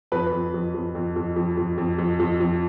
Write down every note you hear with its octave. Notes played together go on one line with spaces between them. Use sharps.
F2 B4
F2
F2
F2
F2
F2
F2
F2
F2
F2
F2
F2